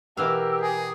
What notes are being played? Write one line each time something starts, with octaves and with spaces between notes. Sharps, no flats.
B2 E3 G4 A#4 F5 E6
G#4 G#5